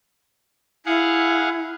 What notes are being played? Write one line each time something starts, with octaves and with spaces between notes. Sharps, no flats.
E4 G#4 F5 F#5